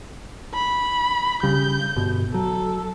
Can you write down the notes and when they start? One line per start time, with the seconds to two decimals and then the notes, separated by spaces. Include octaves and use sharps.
0.55 B5
1.43 C#3 G3 G6
1.96 G1 B2
2.34 F#3 A4